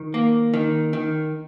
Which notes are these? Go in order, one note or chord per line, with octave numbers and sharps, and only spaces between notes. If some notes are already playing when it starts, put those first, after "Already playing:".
Already playing: D#3
A#3
D#3
D#3